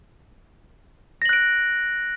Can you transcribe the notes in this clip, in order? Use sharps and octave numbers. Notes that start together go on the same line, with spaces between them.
F#6 A#6 D7 F#7